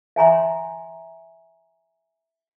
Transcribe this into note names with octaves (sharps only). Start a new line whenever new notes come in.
E5 G#5 A#5 C6